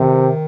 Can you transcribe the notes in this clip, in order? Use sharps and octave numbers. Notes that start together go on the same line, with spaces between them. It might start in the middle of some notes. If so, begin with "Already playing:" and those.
Already playing: C3 D#3